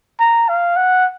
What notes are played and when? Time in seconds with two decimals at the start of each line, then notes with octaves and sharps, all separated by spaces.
0.20 A#5
0.49 F5
0.76 F#5